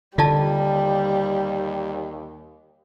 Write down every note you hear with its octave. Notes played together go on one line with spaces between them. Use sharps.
D#2 D3 G3 F4 D5 A5